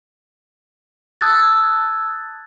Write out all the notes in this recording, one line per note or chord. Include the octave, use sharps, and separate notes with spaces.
A5 D#6 E6 F#6 G#6 A6